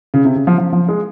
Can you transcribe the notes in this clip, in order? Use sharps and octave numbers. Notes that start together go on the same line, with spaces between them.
C#3
C3
C#3
F3
F3
F3
G#3